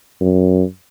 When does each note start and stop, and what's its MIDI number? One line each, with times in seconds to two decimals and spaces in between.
0.21 0.64 42